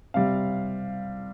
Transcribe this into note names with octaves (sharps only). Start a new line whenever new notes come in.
C3 G3 F5